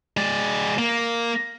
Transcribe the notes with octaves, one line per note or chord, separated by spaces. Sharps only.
G#3 D5
A#3